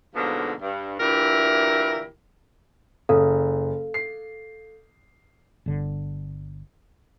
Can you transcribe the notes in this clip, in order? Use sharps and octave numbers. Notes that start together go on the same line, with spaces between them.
G#2 B2 D3 F3 A#3 B3
G2
D2 A#2 E3 E4 G4 A#4
F#1 A4 F5
C7
G1 D3